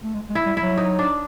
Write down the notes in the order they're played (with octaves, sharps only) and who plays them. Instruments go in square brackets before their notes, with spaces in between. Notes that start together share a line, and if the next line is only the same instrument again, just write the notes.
[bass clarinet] A3
G#3
G#3
[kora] E4
[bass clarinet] G3
[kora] E4
[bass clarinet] F#3
[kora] D#4
D4